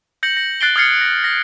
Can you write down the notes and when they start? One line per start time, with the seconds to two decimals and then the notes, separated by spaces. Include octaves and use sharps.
0.23 G6 A#6 C#7 F#7
0.37 A#6
0.61 F#6 A6 C7 D7 G7
0.76 D#6 F6 G#6 A6 C7 C#7
1.01 A#6
1.24 A#6